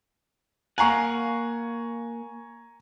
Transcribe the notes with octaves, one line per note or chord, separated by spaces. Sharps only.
A#3 F5 F#5 G#5 A#5 C#6